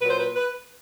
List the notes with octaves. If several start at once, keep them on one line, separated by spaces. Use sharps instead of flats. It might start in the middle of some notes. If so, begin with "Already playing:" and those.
A#2 F#3 B4
C5
B4
B4